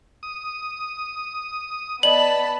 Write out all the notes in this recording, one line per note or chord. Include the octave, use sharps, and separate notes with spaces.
D#6
B3 D5 D#5 A5 B5 F#7